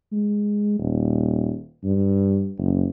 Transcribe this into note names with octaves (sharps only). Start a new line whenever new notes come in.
G#3
D#1
G2
F#1